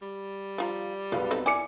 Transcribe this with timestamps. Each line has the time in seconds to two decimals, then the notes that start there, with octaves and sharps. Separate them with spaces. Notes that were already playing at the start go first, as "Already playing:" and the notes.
0.02 G3
0.58 F3 F4 A#5
1.12 B1 G#3 B3 F5
1.31 C4 D#4 A4
1.46 E4 D5 G#5 D6 C#7